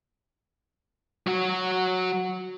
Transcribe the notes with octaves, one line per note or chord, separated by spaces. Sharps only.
F#3 F#4